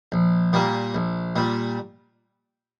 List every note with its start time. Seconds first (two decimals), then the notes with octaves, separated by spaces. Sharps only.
0.12 A#1
0.53 A#2 G3 A#3
0.95 A#1
1.36 A#2 G3